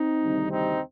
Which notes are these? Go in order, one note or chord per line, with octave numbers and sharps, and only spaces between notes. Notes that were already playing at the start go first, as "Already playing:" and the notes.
Already playing: C4 D#4
D2 C3 D#3 G3
C4 D#4